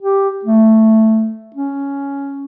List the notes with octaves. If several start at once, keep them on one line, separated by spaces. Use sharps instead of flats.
G4
A3
C#4